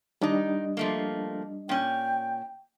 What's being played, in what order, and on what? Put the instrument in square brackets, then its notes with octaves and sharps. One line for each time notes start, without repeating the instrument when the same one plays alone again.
[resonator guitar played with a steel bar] D#3 D#4 [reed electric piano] G3 D4 D#5
[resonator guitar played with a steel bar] F3 A3 A#3
[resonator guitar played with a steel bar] A#2 C#4 [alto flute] G5